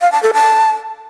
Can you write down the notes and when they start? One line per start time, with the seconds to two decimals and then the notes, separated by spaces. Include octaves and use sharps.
0.01 F5
0.12 A5
0.23 A4
0.33 A5